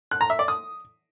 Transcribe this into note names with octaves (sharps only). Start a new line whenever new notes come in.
F#6
A#5
E5
D5
D#6